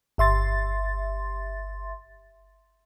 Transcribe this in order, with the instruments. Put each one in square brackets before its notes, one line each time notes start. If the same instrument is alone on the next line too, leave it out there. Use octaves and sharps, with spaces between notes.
[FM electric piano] G1 E5 C6 A6